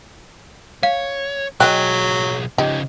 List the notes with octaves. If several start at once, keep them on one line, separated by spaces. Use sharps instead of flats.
C#5 F5
B1 F#3 G#4 D#5 F5 G5 F#6
C#3 F3 D#4 G4